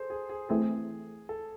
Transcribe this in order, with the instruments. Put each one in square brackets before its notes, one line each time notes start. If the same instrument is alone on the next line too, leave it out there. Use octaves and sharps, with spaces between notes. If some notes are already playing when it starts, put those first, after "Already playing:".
Already playing: [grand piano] G#4 A4 C5
G#4
G#4
[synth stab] E3 A3 C4 [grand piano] G#4
[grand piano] A4